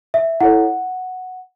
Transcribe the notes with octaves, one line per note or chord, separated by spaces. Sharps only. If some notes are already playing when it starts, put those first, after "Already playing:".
E5
E4 A4 C#5 F#5